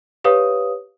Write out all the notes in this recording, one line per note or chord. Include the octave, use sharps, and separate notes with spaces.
G4 B4 C#5 F5 D#6